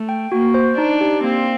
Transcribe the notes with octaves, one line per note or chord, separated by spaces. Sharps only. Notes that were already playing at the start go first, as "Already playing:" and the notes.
Already playing: A3
G5
A#3 F#4
C5
D4 D#4
G4
A#3 C4